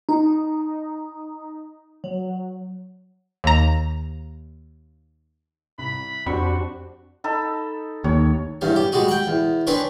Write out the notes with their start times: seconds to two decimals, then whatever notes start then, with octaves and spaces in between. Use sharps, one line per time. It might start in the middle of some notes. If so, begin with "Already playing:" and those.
0.09 D#4
2.04 F#3
3.44 D#2 A#5
5.78 C2 B5
6.26 F2 C4 D4 F#4 G4 B5 C#6
7.24 D#4 A4 B5
8.04 D#2 C#5
8.61 E2 G2 C#4
8.76 G4
8.92 G3 G#3 F#4 G#4
9.08 F#5 G5
9.27 E2
9.67 C4 D4 G#4 B4 C#5